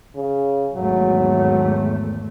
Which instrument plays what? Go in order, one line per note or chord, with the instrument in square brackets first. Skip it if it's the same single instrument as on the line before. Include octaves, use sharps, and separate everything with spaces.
[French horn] C#3
[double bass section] G#1 E2 A3 [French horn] F#3